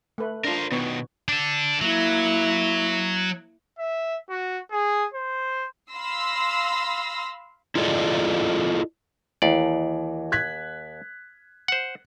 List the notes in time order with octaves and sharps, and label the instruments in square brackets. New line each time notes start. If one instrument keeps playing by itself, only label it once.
[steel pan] A3 B4
[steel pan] D4 F4 [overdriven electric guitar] A#4 C5
[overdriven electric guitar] B2 D#3 [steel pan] B3 C#5
[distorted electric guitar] D4 A4
[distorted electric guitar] F#3 [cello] A#3 E4
[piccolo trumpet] E5
F#4
G#4
C5
[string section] F5 B5 C6 E6 A#6 C7
[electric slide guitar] E4 F4 G#4 A4 D5 D#5
[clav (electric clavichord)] D#2 D5 [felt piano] E3
[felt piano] F#6 G#6 B6
[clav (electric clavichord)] C5 F#5